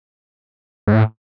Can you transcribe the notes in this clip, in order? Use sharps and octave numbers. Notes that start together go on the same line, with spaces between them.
G#2
A2